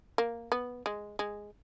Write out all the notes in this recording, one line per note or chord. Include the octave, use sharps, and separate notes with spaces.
A#3
B3
G#3
G#3